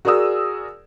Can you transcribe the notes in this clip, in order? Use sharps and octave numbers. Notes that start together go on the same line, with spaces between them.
F#4 G#4 A#4 D5 D#6 E6